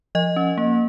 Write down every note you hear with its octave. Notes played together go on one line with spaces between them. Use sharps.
F3 D#5
C#4
A#3